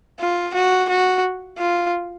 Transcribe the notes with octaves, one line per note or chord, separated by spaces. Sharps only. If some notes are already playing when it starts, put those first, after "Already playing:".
F4
F#4
F#4
F4